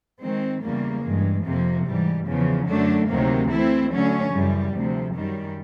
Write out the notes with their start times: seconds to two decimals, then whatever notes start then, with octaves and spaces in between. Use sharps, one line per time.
0.21 D#3 G#3 C4
0.62 E2 C#3 E3 G3 A#3
1.03 G2 E3 G#3
1.44 F2 C3 F3 A#3
1.85 G#2 E3 G3
2.26 E2 C#3 F3
2.67 F#2 D3 F#3 A3 D4
3.09 D2 C3 D#3 F#3 A#3
3.49 E3 A3 C4 E4
3.90 D3 F#3 A3 C#4
4.31 F#2 C#3 E3 G3
4.73 D2 C3 F3
5.14 F#2 D#3 G3